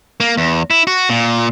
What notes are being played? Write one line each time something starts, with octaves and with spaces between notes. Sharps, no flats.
A#3
E2
E4
F#4
A#2